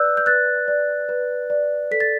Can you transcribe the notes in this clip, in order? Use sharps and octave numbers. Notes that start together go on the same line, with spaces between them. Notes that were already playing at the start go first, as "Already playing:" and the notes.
Already playing: B4 D5 E6 F#6 G6
G6
B4 F#6 A6
D5
B4
D5
A4 B6
A6